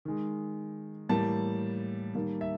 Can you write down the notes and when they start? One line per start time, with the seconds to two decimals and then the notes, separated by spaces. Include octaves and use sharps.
0.05 D#3 G#3
1.09 A2 E3 G3 A#3 A5
2.14 D#3 G3 A#3
2.41 E5